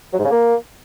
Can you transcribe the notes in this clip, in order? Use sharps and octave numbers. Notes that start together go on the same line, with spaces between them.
F#3
G#2
C#3
A#3